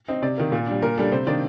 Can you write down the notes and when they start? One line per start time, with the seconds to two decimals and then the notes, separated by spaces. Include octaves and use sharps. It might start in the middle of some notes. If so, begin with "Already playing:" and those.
0.08 C4 D#4
0.22 C3 D5
0.38 D#3 A#3
0.52 A#2
0.67 G3 D4
0.82 A#2 A#4
0.98 G3 D4 A4
1.12 C3 C5
1.27 D#3 A#3 D4 D5